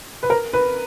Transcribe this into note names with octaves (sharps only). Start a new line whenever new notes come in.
B4
A#4
B4